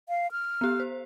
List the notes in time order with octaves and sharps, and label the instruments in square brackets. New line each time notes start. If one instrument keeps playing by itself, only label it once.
[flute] F5
F6
[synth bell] B3 G4
C5